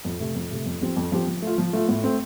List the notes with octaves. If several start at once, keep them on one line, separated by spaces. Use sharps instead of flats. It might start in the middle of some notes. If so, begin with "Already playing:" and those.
F2
C3 A3
F2
C3 A3
F2
F3 C4 G4
F2
F3 C4 G4
F3
A3 F4
F3
A3 F4
A2
A3 C4